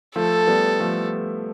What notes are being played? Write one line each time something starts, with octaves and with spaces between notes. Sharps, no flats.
F3 A3 A4
G3 B3
F3 A3